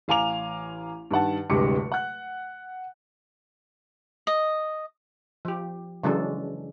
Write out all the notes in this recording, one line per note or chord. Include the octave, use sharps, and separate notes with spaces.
A1 F5 G#5 A#5 D6 F7
G2 D#3 F#5 A5
D1 G2 C3 G#3 D6 C#7
F#5 F#6
D#5
F3 G4
C#3 E3 F#3 G#3 D4 A4